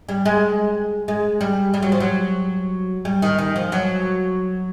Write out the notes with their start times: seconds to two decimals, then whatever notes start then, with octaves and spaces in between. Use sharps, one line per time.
0.09 G3
0.25 G#3
1.08 G#3
1.41 G3
1.74 G3
1.82 F#3
1.92 F3
2.00 F#3
3.05 G3
3.22 D#3
3.39 D#3
3.56 F3
3.72 F#3